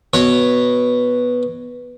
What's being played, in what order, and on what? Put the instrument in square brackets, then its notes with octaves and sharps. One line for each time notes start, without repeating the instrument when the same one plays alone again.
[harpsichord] B2 C#5